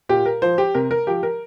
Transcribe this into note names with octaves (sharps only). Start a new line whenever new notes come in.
A#2 G4
A#4
F3 C5
G4
C3 A#4
A#4
F3 G4
A#4